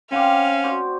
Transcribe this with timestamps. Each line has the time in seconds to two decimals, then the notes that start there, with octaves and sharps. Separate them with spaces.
0.12 C4 C#4 F5 F#5 D6
0.64 F#4 C5 D5